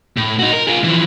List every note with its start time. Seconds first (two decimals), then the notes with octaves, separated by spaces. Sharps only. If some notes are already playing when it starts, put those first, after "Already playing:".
0.17 A2
0.39 D#4 F#4
0.53 A#4
0.67 F4 G#4
0.84 E3 F3